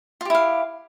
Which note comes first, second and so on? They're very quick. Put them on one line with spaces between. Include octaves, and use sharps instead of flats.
F4 G4 E4 F5